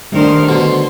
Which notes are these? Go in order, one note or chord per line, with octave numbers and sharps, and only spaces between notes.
D#3 G3 A3 D4 A#4 C5
B2 D3 C5